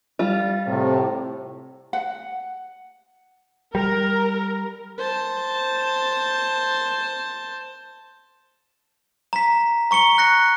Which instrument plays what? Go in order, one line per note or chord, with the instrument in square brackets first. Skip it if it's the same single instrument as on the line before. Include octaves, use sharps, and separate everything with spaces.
[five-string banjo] G3 F4
[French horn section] A2 C3
[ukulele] F#5
[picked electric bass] G3 [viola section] A#4
[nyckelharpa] C5 A5
[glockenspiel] A#5 B6
A#5 C#6 C#7 G7
F#6 A#6 C#7